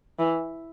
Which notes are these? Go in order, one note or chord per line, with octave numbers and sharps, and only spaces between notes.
E3